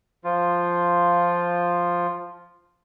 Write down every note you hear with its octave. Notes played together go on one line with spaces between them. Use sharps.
F3 F4